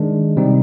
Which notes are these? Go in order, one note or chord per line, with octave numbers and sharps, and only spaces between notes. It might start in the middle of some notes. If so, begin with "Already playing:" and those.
Already playing: D#3 G#3 D4
C3 G3 C4 D#4